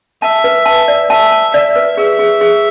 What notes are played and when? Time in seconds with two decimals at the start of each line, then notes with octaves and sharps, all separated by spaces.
0.22 E5 A5
0.44 B4
0.66 A5
0.88 D5
1.10 E5 A5
1.32 A5
1.54 D5 E5
1.76 B4
1.97 G#4 E5
2.19 G#4
2.41 G#4